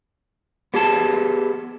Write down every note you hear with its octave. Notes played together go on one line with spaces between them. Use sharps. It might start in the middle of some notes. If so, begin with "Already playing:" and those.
B3 G4 G#4 A5